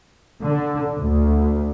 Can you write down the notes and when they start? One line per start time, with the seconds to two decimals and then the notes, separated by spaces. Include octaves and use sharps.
0.42 D3
0.97 D2